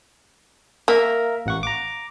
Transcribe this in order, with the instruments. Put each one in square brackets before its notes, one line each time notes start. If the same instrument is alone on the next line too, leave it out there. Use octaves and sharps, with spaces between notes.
[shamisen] A#3 [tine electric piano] A#4 E5 A#5
[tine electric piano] A1 F#5 C#6
A#5 D6